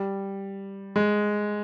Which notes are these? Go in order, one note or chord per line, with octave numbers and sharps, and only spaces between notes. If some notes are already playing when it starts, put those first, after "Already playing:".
Already playing: G3
G#3